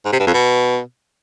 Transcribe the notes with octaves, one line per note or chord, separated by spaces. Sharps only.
G#2
C3
G2
F2
B2